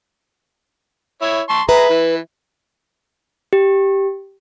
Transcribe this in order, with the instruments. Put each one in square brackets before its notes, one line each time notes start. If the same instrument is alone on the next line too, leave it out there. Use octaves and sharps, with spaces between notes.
[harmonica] E4 C#5
A5 C6 C#6
[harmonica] G#4 A#5 [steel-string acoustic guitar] B4 E5
[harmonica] E3
[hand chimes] G4